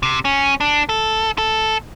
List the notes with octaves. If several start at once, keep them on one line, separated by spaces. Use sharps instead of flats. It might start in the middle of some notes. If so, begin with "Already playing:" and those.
C3
C#4
D4
A4
A4